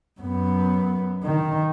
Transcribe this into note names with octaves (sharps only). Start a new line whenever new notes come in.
F#2 B3
D#3